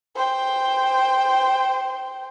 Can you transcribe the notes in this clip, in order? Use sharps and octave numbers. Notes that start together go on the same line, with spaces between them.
C5 G5